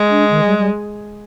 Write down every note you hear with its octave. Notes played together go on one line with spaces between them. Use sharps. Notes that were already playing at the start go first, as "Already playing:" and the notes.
Already playing: G#3
D4
D#3
G3
G3